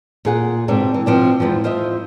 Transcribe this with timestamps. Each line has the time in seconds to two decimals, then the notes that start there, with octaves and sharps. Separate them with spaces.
0.25 A#2 G#4 F#5
0.68 G#2 B2 D3 C4 D4
0.94 E3
1.06 B2 F3 C4 D4
1.40 E2 G#2 E3 F3
1.64 F4 C5 D#5 E5